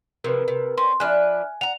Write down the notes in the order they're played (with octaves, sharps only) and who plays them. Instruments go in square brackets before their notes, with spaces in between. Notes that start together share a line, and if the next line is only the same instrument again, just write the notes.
[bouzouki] C3 E3 F3 [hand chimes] A#4 B4
[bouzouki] C3
[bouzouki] C4 C#4 [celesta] C6
[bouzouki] F3 D4 B4 [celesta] E5 F6 F#6 [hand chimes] G#5
[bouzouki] F#5 A#5 [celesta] F7